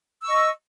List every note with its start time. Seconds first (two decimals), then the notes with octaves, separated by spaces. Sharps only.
0.22 E6
0.25 C#6
0.28 D#5